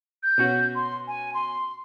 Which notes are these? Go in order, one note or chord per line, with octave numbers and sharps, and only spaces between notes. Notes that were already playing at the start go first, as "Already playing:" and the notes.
G6
B2 C#4 F#4
C6
G#5
C6